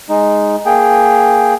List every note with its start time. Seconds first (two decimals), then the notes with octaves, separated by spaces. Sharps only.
0.09 G#3 D#4
0.66 A#3 G#4 G5